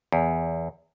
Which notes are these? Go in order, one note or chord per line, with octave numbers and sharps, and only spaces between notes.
E2